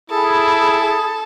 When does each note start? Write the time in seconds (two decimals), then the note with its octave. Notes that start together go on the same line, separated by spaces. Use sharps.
0.10 E4 G#4 A4 B5 D#6